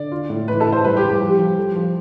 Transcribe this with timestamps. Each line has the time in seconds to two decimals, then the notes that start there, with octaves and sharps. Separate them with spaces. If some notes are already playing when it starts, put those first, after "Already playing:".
Already playing: D3 D5
0.12 F4
0.30 A2
0.48 E3 B4
0.60 A4
0.66 E3
0.72 C5
0.84 G3 B4
0.97 G4
1.03 G3
1.09 G4
1.21 F3
1.39 F3
1.58 A4
1.76 F3